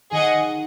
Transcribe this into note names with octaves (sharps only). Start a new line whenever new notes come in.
D#3 G#4 D#5 F#5